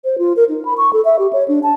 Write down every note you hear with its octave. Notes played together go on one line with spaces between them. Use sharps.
C5
F4
A#4
D#4
B5
C#6
A4
E5
G4
C#5
D4
A5